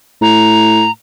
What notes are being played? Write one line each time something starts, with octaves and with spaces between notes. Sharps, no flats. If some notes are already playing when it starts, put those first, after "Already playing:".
A2 A#5